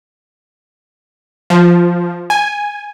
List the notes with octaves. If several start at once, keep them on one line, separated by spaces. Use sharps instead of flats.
F3
G#5